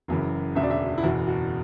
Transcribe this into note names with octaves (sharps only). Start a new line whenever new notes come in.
F#1 F#2 C#3 E3
E1 D2 C#3 E5
D5
E5
E4
F#1 E2 B2 F#4
F#4